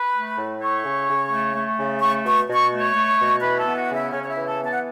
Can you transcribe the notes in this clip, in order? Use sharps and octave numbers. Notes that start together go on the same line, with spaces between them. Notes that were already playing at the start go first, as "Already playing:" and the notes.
Already playing: B4 B5
A3
A2
A3 C#5 C#6
C#3
C#3
A3
A3
C#3
A3 C#6
B2 C#6
B2
C#6
A3
C#5 C#6
A3
B2
E3 B4 B5
A4 A5
B3
F#4 F#5
C#3
E4 E5
C#3 C#4 C#5
C#5
E4 E5
E3
A4 A5
B3
A5
F#5